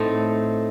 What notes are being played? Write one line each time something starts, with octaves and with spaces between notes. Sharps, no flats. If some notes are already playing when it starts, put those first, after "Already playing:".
Already playing: A2 A3 C4 D#4